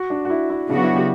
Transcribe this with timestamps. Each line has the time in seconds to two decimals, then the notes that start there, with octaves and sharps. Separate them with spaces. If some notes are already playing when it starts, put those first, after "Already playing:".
Already playing: F#4
0.10 D4
0.25 F#4
0.30 E4
0.50 E4
0.69 C#3 F#3 B3 D4 F#4
0.83 E4
0.96 G4